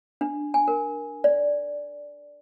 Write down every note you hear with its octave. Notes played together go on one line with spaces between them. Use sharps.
D4
G#5
A#4
D5